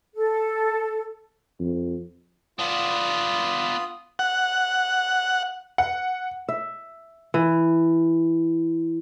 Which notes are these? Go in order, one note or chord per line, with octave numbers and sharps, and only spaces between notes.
A4
F2
B3 D4 F4 D#6
F#5
F#5
E5
E3